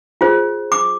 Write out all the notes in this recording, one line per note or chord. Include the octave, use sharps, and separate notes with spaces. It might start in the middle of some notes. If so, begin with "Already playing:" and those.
F4 G#4 C5
D6